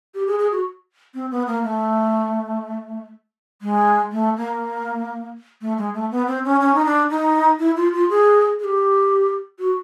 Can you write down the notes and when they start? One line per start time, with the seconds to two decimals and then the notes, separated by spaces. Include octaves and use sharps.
0.15 G4
0.27 G#4
0.39 G#4
0.52 F#4
1.15 C4
1.31 B3
1.47 A#3
1.64 A3
3.62 G#3
4.12 A3
4.37 A#3
5.61 A3
5.78 G#3
5.94 A3
6.11 B3
6.27 C4
6.45 C#4
6.61 C#4
6.74 D#4
6.86 D4
7.10 D#4
7.59 E4
7.76 F4
7.93 F4
8.10 G#4
8.59 G#4
8.64 G4
9.59 F#4